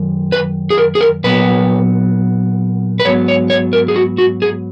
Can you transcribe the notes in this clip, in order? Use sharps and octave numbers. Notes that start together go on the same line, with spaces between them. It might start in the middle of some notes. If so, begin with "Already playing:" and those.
Already playing: F#2 D#3
B4
G#4
A#4
G#4
A#4
A#2 F#3 B3 B4
B4
G#2 F#3 B3 C#5
C#5
C#5
A#4
G#4
F#4
F#4
G#4